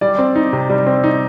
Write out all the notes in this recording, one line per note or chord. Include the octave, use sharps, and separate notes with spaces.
G3 D5
C4
D#4
C3
G3
C4
D#4